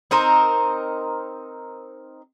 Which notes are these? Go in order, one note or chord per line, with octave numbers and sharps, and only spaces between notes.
C4 D#4 A#4 C5